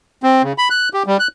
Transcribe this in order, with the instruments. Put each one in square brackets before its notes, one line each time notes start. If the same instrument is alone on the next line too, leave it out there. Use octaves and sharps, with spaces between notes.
[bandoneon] C4
C#3
B5
F#6
G4
G3
F#6